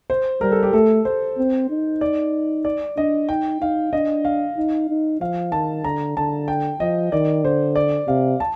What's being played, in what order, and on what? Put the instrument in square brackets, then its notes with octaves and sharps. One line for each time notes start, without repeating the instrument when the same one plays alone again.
[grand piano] C5
[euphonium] G3 [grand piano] A#4
[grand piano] A4
G4
[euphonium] A3 [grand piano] A4
[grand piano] C5
[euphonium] C4
D#4
[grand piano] D5
D5
[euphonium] D4 [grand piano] D#5
[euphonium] D#4 [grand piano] G5
[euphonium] D#4 [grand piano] F5
[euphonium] D4 [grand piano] D#5
[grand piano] F5
[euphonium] D#4
D#4
[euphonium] F3 [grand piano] F5
[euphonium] D#3 [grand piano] A5
[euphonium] D3 [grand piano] A#5
[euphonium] D3 [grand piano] A5
[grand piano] G5
[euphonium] F3 [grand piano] D#5
[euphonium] D#3 [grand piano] D5
[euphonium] D3 [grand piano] C5
[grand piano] D5
[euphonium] C3 [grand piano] F5
[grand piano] A5